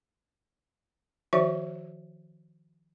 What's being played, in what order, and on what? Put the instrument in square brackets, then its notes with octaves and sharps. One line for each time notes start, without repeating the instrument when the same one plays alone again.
[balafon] D#3 F3 F#4 C5 D5 E5